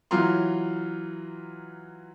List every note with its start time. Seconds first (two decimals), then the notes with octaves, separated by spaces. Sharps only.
0.11 E3 F#3 F4 A#5 C6